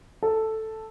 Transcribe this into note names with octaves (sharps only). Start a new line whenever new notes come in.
A4